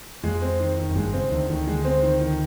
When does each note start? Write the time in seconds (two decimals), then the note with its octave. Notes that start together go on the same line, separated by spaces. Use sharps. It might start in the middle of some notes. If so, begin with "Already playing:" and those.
0.24 F2 G#3
0.42 C4
0.60 D#3
0.77 D#3
0.91 F#2
0.95 G1 G2 G#3
1.13 C#2 C#3 C4
1.31 D2 D3 D#3
1.49 D2 D3 D#3
1.67 G#3
1.85 C4
2.02 D#3
2.21 D#3